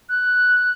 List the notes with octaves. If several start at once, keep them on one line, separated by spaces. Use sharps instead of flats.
F#6